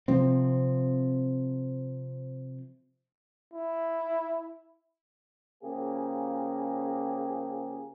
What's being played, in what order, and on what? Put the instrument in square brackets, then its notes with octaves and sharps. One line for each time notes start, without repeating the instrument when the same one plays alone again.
[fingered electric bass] C3 F3 C4
[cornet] E4
[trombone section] C#3 F3 A#3 G4 G#4